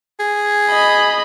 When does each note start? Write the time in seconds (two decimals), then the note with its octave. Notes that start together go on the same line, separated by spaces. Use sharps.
0.20 G#4
0.69 D#5 B5